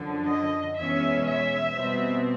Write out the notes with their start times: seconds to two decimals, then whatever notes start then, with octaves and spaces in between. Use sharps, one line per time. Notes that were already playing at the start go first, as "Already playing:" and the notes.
Already playing: F#2 D3 F3
0.27 D#5
0.77 E2 B2 G#3 C#4 E5
1.25 E5
1.75 B2 G3 C4